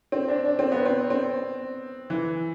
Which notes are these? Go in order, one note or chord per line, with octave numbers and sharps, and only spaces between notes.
C4
D4
D4
C4
B3
C4
C4
E3